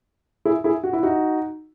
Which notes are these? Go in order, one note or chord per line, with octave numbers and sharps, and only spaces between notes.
E4 G#4
E4 G#4
F#4
E4
D#4 F#4